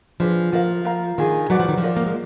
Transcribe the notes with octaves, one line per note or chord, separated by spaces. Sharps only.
F3 D4 G#4 B4
F3 F4 A#4 F5
F4 A#4 F5 A#5
D#3 D4 F4 G#4
F#3 F#4 B4 D5 F#5
F3
D#3
F3
F4 A#4 D5
A#3
G#3